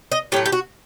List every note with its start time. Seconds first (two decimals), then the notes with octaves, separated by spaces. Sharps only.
0.12 D#5
0.32 A2 F#3 A3 G4
0.46 G4
0.52 F#4